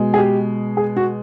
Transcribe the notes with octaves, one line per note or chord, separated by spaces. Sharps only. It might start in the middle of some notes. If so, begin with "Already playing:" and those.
Already playing: B2 G#3
G#4
G4
G#4
F#4